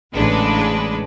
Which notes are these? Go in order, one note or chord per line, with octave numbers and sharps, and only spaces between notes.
A1 C#3 G#3 D4 B4